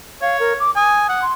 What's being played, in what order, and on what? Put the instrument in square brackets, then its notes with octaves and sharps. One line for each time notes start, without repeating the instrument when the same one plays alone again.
[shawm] C#5 [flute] F5
[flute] A#4
D6
[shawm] G#5 [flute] D#6
[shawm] F#5
[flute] C6